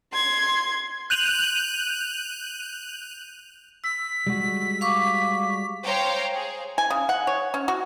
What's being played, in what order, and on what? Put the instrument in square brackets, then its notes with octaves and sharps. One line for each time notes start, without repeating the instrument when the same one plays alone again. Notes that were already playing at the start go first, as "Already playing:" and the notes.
[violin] C6 G#6
[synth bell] F#6 G6 D#7 F7 F#7
[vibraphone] E6 [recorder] B6
[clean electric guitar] G3 G#3 F#4
[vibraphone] F5 C#6 D6
[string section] C5 C#5 F5 G5 A#5
G#4
[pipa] G#5
C#3
F#5
C#5
C#4
F#4